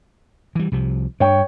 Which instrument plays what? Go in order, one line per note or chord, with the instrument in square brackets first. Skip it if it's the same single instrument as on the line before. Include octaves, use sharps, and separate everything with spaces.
[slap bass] E3 G3
C2 C3 F3
[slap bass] G2 D4 [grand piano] C#5 G5 C#6